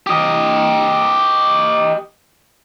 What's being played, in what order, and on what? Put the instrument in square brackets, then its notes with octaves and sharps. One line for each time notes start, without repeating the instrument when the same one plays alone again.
[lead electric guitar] G4 D#5